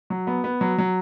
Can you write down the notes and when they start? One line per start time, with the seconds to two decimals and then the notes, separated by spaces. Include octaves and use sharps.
0.10 F#3
0.27 B3
0.44 B3
0.61 F#3
0.78 F#3